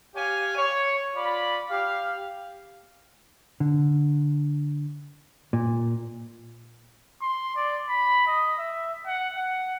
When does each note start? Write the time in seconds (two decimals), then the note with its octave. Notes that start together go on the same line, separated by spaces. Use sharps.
0.15 G4 C#5 F5 G#5
0.56 C#5
1.15 F4 D5 B5
1.70 G4 F5
3.60 D3
5.53 A#2
7.22 C6
7.56 D5
7.89 B5
8.27 D#5
8.58 E5
9.07 F#5
9.36 F#5